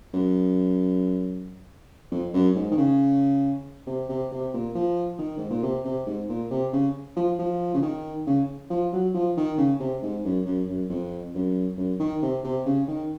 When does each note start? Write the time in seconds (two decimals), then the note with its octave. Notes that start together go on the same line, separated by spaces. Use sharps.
0.13 F#2
2.11 F2
2.34 F#2
2.56 G#2
2.72 D#3
2.77 C#3
3.87 C3
4.09 C3
4.32 C3
4.54 A#2
4.75 F3
5.18 D#3
5.38 G#2
5.50 A#2
5.63 C3
5.85 C3
6.07 G#2
6.29 A#2
6.51 C3
6.73 C#3
7.16 F3
7.39 F3
7.74 C#3
7.82 D#3
8.27 C#3
8.70 F3
8.93 F#3
9.14 F3
9.37 D#3
9.58 C#3
9.80 C3
10.02 G#2
10.25 F#2
10.46 F#2
10.68 F#2
10.90 F2
11.35 F#2
11.78 F#2
12.00 D#3
12.22 C3
12.44 C3
12.66 C#3
12.88 D#3